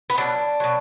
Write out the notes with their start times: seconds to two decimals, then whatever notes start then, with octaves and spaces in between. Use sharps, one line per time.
0.10 B3
0.18 B2 F#3 D4
0.60 B2 F#3